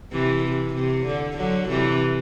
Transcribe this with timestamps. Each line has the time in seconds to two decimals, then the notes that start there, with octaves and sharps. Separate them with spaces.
0.12 C3 E3
0.44 C3
0.74 C3
1.06 D3
1.37 D3 F#3
1.69 C3 E3